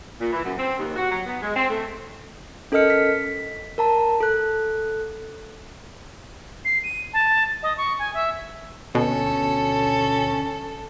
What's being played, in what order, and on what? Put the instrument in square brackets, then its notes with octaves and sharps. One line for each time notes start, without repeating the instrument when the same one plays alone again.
[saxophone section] A#2
E3
F#2
C4
D#2
F#4
F#3
B3
G#3
C4
A3
[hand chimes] C#4 A4 A#4 D#5 F6 C#7
B6
A#4 A5 A#5
A4 F#6
[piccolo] C7
D#7
A5
D#5
C#6
G#5
E5
[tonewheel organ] D2 D3 [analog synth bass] B2 [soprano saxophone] C#4 [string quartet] A4